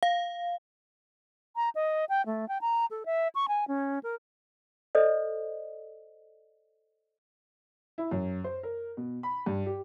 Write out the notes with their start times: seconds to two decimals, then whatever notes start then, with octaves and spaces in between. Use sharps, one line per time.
0.03 F5
1.56 A#5
1.75 D#5
2.09 G5
2.26 A3
2.48 G5
2.61 A#5
2.91 A4
3.06 E5
3.35 C#6
3.48 G#5
3.68 C#4
4.03 A#4
4.95 A4 C5 D5 D#5
7.98 E4
8.11 F#2
8.44 C5
8.63 A#4
8.97 B2
9.23 B5
9.46 G2
9.66 G4